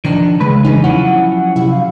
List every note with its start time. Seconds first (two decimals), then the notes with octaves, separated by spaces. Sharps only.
0.05 D#3 F3 D4 A#5
0.41 C#3 G#3 B4
0.65 E2 G2 C#4 D#4
0.84 F3 F#3 C#4 E4 F#5
1.56 C3 E4
1.72 F5